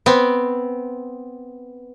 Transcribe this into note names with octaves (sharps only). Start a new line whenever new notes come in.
B3 C4